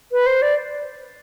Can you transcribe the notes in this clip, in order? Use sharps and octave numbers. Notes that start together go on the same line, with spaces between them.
B4
C5
D5